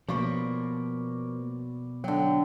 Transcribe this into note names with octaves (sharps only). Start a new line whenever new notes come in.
B2 F3 A#3 D5 B5 C#6
D3 F#3 G5